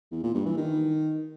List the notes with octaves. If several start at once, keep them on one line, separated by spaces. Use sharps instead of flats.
E2
A#2
G2
E3
D#3